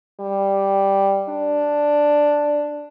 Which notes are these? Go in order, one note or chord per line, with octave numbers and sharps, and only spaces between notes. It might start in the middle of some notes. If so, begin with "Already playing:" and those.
G3
D4